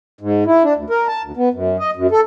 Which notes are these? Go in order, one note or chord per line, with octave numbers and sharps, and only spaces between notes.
G#2
E4
D4
D2
A#4
A5
D2
B3
F#2
D#5
F#2
A4